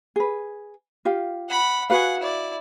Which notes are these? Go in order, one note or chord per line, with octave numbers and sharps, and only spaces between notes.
G#4 B4
F4 G4 F5
F#5 B5
F#4 G#4 B4 F5 F#5
E4 D5